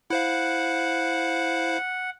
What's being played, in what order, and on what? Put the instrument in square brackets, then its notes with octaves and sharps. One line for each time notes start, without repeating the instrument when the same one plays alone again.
[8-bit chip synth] E4 C5 F5 [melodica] F#5